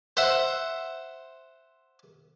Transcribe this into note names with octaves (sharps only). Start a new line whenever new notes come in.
C5 E5 F#5